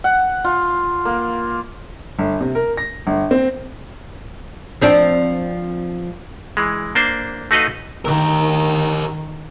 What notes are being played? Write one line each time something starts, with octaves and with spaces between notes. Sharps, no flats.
F#5
F4
A#3
G1
C3
A#4
A#6
G1
C4
F3 C4 D4
E3 G#3
A#3 D4 C5
A3 D#4 F#4 B4 D#5 F5
D#3 G4 A#4